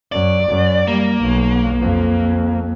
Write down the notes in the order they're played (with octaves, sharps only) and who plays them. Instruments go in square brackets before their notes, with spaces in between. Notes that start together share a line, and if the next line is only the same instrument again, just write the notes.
[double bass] F#2 [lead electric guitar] D5
[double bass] F#2
[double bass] G3 [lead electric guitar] A#3
[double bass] B1
F2